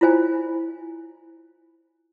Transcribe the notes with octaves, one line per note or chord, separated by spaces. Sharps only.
E4 F4 C5 G#5